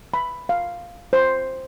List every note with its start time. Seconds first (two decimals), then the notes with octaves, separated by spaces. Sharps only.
0.14 B5
0.49 F5
1.13 C5